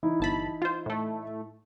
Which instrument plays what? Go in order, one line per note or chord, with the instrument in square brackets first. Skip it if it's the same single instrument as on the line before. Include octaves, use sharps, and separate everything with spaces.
[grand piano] E3 D#4 E4
[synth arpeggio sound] G1 A5 B5
F4 C5
A2 A3